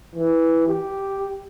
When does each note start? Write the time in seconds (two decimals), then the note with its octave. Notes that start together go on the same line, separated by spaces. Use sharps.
0.15 E3
0.67 G4